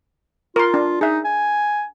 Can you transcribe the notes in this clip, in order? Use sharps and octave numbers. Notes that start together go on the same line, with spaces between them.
F4 A#4 C6
D4
D#4 G#4 E5
G#5